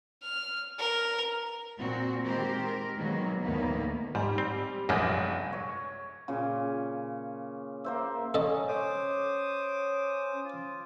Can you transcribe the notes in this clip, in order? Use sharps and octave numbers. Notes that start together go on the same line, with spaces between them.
F6
A#4
A#2 C4 F#4
D#3 G#3 C4 G4 A#4 C5
C4 A#4
B2 D#3 F#3 G#3 A#3
D2 A2 D#3 A#3 B3
G#2 G3
C4
F1 A#1 F#2 G3 G#3 A#6
C#5
A#2 C#3
A#3 C5 E5
C#4 A4 D#5
C5 D6 D#6
F4